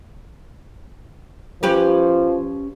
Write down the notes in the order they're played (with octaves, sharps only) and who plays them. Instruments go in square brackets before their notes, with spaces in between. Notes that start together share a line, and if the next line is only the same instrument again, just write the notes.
[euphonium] F3 [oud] C#4 G4 B4